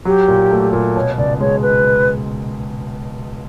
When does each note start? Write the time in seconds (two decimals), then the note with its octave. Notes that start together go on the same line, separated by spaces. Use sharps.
0.05 F#3 G4
0.28 A#2
0.51 A3
0.73 A#2
0.96 B2 C#5
1.18 C#2 D5
1.40 G#3 C#5
1.62 B4